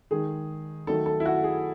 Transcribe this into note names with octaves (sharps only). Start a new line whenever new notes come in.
D#3 G#3 G#4
D#3 F#3 A3 A4
A4
E4
F#4
G#4